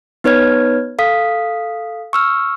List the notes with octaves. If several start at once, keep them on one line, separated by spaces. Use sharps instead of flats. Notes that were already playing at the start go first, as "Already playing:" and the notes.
B3 D#4 B4 C#5 F6 G#6
A4 F5 D#6 B6
C#6 E6 F6